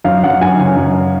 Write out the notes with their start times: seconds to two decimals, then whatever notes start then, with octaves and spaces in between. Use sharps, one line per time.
0.04 F#2 F5
0.24 F#2 F#5
0.41 F#2 G#5
0.59 C#3 G#5
0.76 F#2